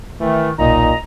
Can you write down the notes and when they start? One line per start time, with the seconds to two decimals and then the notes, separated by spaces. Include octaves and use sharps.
0.20 D#3 E3 A3
0.59 D#1 B1 A#2 D#4 D#5 A#5